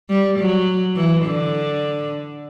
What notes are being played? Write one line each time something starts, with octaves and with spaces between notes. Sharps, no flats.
G3
F#3
E3
D3